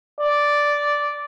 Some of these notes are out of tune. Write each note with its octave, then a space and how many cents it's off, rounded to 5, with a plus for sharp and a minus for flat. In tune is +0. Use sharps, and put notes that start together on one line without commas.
D5 -5